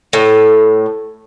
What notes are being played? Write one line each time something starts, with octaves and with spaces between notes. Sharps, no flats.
A2